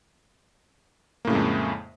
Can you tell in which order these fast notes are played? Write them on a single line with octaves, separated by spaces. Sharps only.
A#3 A2 C#3 G#3 F2